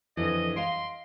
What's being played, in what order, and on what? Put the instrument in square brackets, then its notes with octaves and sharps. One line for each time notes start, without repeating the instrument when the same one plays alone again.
[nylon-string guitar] F2 D3 [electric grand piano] E3 [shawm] D#5
[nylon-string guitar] D#5 F5 [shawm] C6 [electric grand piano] D7